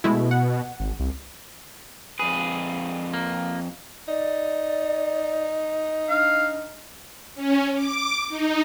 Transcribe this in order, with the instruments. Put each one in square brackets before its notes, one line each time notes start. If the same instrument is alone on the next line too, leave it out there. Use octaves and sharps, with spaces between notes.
[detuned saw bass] B2 [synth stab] G#3 A3 E4
[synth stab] F#5
[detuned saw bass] G#1
C2
[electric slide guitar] F2 B4 [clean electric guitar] G#4
[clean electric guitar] A#3
[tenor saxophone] D#4 [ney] D5
[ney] D4 [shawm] F5
[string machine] C#4
D6
D#4